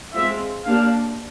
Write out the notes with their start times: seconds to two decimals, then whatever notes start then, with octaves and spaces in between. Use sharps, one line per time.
0.14 G#3 C4 F4 E5
0.65 A#3 D4 G4 F5